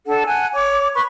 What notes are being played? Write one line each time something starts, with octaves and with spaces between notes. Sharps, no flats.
D4 A4 F#5
F#5 G#5 A5
C#5 D6
B4 B5 C#6